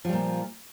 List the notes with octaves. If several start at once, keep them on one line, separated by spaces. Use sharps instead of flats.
A#2 F3 G3